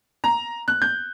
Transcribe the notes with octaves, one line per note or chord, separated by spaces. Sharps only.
A#5
F#6
G6